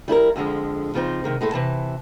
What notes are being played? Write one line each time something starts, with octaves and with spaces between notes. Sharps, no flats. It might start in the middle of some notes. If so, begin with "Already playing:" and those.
G3 E4 A4 A#4
F2 D3 F3 G#3
C#3 F3 C4 D#4
C3 D#3 G#3
A2 G#3 E4 A4
C3 E3 A5